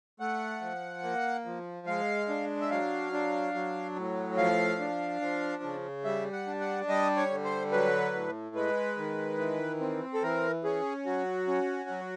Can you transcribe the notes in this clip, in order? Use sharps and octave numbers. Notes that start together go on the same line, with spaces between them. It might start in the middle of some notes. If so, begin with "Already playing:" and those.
A3 F#5
F3
A#3
F3
G#3 F5
D4
E5
F#3 F5
D4
F#3
A2
F3 F5
D4
F3
C#3
G3 E5
F#5
D4
F#5
G3 D#5
C#5
D3
C5
F#3 B4
A2
G#3 B4
D#3
E3
C4
A4
E3 A#4
C#4 G#4
F#3 F#4
C#4
F#3